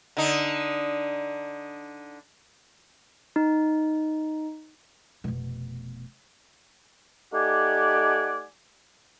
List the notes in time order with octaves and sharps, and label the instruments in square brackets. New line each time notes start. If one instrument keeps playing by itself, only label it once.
[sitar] D3 D#4
[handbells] D#4
[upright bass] F1 B2
[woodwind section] A3 D#4 G4 D5 F#5 G#5